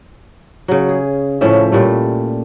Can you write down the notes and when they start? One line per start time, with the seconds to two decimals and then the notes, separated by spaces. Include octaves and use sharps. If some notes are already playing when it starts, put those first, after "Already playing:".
0.68 C#3 F#3
0.89 G#4
1.41 A2 F3 C#4 E5
1.72 A#2 G3 A3